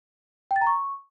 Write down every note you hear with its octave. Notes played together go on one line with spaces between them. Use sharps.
G5
A6
A#5
C#6